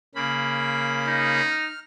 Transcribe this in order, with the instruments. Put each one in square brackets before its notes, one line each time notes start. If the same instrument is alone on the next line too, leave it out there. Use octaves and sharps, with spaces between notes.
[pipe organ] C#3 A#3 B5
[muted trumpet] D#4
[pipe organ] F6